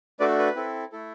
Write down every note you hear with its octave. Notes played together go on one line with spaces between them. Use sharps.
A3 D4 F#4 A4 B4 D5
B4
C4 E4 A4
A3 E4 A4